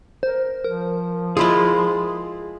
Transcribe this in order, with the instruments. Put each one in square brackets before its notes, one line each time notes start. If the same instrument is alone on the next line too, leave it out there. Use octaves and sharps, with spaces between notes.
[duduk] A#4 [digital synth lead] C5
[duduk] F3 [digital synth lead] A#4
[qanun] G#3 E4 F4 [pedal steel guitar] G#4 B5